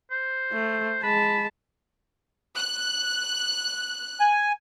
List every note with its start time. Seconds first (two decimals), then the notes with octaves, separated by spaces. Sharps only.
0.11 C5
0.52 A3
1.03 G#3 A5 B5
2.55 F#6
4.20 G#5